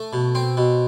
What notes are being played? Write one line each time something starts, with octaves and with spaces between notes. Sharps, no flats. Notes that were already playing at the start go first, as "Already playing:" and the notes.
Already playing: A3
B2
C4
B2